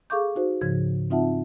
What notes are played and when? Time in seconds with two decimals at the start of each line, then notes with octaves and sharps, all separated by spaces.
0.10 G#4 A4 F5 C#6 D6 G6
0.36 D#4 F#4 C5
0.61 G#2 C#3 F3 G#6
1.10 C4 D#4 F4 E5 F#5 A5